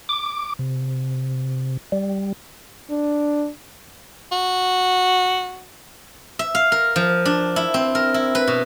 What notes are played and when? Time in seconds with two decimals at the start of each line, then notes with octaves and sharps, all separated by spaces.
0.09 D6
0.59 C3
1.92 G3
2.90 D4
4.32 F#4
6.39 E5
6.55 F5
6.72 A#4
6.96 F3
7.25 D4
7.56 E4
7.74 C4
7.95 A#4
8.14 E4
8.35 B4
8.47 B2